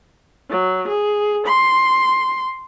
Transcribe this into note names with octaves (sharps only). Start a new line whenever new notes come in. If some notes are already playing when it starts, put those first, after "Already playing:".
F#3
G#4
C6